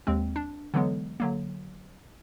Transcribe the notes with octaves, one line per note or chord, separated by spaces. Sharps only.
D#2 G#3 C4
D4
D3 E3 F#3 G#3 B3
D3 F#3 A#3